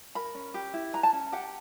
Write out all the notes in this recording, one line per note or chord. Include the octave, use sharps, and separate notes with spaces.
A#4 B5
C#4
G4
E4
B4 A#5
A5
C#4
G4 F#5